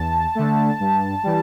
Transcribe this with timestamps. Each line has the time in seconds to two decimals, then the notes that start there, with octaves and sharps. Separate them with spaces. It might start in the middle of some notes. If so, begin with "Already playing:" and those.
Already playing: E2 A5
0.35 D3 A3
0.80 G2
1.23 E3 G3